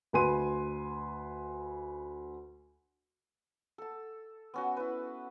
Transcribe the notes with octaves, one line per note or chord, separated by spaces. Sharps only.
D2 B4 G#5 C6 D#7
A4 A5
B3 C#4 F#4
E4 B4